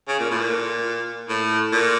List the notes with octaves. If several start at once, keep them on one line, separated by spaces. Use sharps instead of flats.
C#3
A#2
A2
A#2
A2
A#2